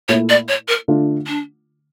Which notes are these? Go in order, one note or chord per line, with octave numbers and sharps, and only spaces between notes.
A#2 A3 E4 C#5
D5
C#5
A#4
D3 A3 D4 F4
D4